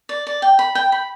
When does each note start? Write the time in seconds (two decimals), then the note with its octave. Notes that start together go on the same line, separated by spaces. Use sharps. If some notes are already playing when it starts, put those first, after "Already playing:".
0.09 D5
0.27 D5
0.42 G5
0.59 B5
0.75 G5
0.92 B5